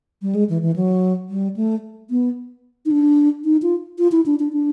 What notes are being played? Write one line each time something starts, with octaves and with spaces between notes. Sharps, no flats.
G3
G#3
E3
E3
F#3
G3
A3
B3
D#4
D4
D#4
F4
F4
E4
D4
D4
D4